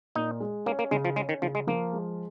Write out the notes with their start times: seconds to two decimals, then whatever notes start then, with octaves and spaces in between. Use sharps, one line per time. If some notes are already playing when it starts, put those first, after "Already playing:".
0.15 A#2 D#4
0.40 G#3
0.66 A#3 C#4
0.79 A#3
0.91 C#3 G#3
1.05 F3
1.16 G#3 C#4
1.29 D#3
1.42 C#3 F3
1.55 G#3
1.67 F3 A#3
1.93 G#3